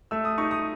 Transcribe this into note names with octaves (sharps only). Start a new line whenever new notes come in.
A3 E6
D#6
D#4 C#6
D#6